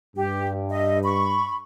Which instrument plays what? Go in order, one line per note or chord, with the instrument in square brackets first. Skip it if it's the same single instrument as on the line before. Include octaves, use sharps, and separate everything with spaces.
[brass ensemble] G2 [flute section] G4
[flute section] D#5 E5
B5 C#6